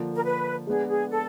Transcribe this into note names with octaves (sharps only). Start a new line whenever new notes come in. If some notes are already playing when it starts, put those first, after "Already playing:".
Already playing: D3 F3 A#3 D4 F4
A#4
B4
G#3 B3 D4 G#4
G#4
A4